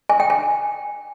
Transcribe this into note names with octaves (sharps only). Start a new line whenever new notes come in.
G#5
G5
G#5